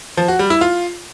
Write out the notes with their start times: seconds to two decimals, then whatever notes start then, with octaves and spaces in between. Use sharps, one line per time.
0.17 F3
0.28 F#4
0.39 G3
0.50 E4
0.61 F4